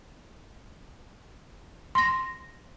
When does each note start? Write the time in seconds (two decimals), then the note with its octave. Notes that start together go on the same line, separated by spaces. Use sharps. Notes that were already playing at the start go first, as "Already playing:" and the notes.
1.95 C6 A#6